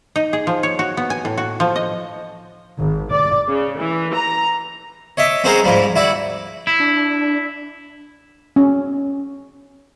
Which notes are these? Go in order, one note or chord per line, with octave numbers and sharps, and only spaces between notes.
D#4
G#4
F3
C#5
F#4
B3
G#5
A2
F#4
F3
D#5
G#1
D5
C#3
E3
A#5
C#5 D#5 E5 D6
C4 C#4 F#4 G#4 A#4 C5
G#2 F3 G3
E4 F#4 D5
E4
D4
C#4